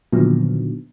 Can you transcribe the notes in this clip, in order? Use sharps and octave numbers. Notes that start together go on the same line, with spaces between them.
A#2 D3 D#3 F3 F#3 B3